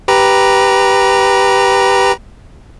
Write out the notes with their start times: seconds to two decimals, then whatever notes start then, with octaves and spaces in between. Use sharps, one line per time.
0.08 G4 B4 A#5